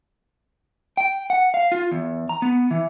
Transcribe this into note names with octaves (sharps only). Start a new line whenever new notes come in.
G5
F#5
F5
F4
E2
A#5
B3
E3